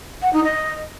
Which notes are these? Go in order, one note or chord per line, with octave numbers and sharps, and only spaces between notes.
F#5
D#4
D#5